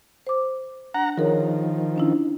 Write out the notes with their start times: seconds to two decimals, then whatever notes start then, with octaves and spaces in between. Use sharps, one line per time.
0.27 C5 D6
0.94 D4 F#5 A#5
1.17 D#3 F3 G#4 A#4 C#5
1.96 C#4 D4 E4